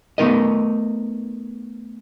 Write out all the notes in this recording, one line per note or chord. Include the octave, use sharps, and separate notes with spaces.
A3 B3 D#4 A#4 D#5